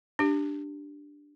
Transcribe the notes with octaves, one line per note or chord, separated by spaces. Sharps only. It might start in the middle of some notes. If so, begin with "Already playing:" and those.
D4 G4